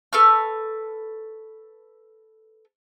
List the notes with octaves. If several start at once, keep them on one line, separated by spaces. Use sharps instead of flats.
A4 B4 C#6 F6